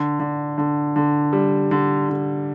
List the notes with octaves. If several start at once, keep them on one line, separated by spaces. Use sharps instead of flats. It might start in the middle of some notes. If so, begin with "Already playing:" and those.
Already playing: D3
D3
D3
D3
G3
D3
D3